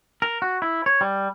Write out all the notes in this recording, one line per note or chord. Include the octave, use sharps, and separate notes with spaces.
A#4
F#4
E4
C#5
G3